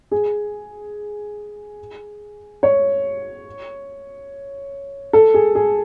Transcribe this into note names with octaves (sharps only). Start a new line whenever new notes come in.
G#4
C#5
A4
G#4
G#4